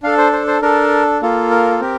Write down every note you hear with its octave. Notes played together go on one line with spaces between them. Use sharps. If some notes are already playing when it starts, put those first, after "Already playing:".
D4 A4 F5
C5
C5
C5
D4 A4 A#4
A#3 F4 A4
A#4
C4 G4 A#4